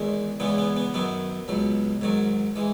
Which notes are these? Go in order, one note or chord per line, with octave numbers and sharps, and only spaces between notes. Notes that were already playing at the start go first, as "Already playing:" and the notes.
Already playing: E2 D#3 G#3
E2 C#3 E3 G#3 B3
B3
B3
F#2 D#3 F#3 B3
C#2 B2 F#3
G#2 D#3 F#3
E3 G#3